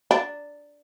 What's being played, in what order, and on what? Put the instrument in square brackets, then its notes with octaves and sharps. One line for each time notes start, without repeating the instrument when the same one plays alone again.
[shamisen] D4